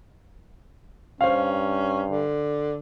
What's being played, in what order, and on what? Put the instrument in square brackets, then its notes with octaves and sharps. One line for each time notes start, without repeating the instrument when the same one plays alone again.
[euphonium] G2 [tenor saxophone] C#4 [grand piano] C5 F5
[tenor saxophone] D3